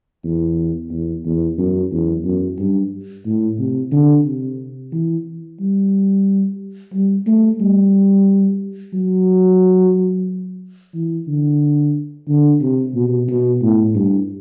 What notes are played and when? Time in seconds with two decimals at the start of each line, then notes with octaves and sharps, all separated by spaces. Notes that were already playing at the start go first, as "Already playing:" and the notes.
0.24 E2
0.91 E2
1.25 E2
1.58 F#2
1.91 E2
2.25 F#2
2.59 G2
3.25 A2
3.59 C3
3.92 D3
4.26 C3
4.92 E3
5.60 G3
6.93 G3
7.27 A3
7.60 G3
8.93 F#3
10.94 E3
11.28 D3
12.28 D3
12.61 C3
12.95 B2
13.28 B2
13.62 A2
13.95 G2